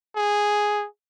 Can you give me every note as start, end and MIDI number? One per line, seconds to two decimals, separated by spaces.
0.16 0.86 68